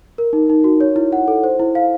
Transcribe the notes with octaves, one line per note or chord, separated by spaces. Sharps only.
A#4
D#4
D#4
F#4
C#5
E4
F#5
A4
C5
E4
F5